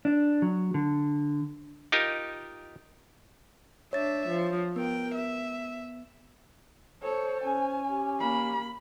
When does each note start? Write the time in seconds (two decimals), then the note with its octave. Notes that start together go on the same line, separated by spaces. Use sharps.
0.05 D4
0.42 F#3
0.74 D3
1.92 D#4 F4 G4 A#4 D#5
3.93 D4 C#5 E5 A6
4.29 F3
4.76 B3 A#4 G5
5.15 E5
7.02 A4 C5 C#5
7.44 C#4 G#5
7.88 G4
8.19 A#3 B5